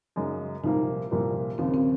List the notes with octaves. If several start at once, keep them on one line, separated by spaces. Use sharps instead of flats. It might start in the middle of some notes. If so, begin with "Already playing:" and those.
F#2 C#3 G#3 D#4
C2 A#2 F3 A#3 D#4
C2 A#2 F3 A#3
D#2 C#3 F3 C4
C4